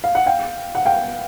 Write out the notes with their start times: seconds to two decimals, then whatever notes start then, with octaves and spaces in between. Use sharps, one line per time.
0.04 F5
0.15 F#5
0.26 F5 G5
0.75 F#5
0.85 F5 G5